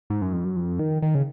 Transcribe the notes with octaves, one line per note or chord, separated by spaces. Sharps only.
G#2
F#2
F2
F#2
F2
D#3
D#3
C#3